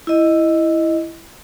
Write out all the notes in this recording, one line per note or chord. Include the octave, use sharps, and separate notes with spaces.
E4 D#5